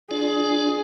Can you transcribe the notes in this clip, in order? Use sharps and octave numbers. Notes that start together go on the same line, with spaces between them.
D4 F4 G#4 D5